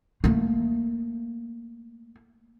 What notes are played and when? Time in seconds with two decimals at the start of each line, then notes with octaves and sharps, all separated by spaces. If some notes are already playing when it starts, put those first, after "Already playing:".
0.24 A3 A#3